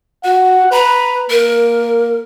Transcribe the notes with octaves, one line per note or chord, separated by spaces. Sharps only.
F#4 F#5
B4 A#5
A#3 A#4